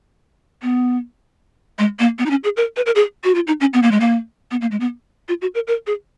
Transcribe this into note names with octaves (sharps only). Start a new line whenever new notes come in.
B3
G#3
A#3
B3
D#4
C#4
G#4
A#4
B4
A#4
G#4
F#4
F4
D#4
C#4
B3
A#3
G#3
A#3
B3
A#3
G#3
B3
F4
F#4
A#4
A#4
G#4